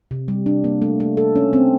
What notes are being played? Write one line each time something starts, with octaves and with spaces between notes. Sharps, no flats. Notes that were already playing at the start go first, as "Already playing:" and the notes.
C3
G3
D4
A#3
A3
A3
A4
C#4
C4